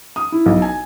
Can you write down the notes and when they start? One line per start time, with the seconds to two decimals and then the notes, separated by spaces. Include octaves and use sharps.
0.16 D#6
0.32 E4
0.46 B1
0.62 G#5